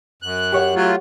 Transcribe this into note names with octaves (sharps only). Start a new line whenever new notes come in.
F#2 F#6
G4 C#5 F#5
F#3 A3 F4